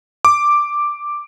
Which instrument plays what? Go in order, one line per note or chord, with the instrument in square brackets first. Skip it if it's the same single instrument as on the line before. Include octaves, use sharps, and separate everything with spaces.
[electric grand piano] D6